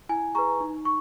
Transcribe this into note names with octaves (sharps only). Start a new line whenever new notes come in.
E4 G#5
G#4 B4 A#5 C#6
D#4
C#6